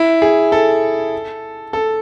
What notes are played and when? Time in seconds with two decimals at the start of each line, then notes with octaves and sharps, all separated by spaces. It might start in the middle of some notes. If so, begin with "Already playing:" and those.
Already playing: E4
0.22 G#4
0.52 A4
1.73 A4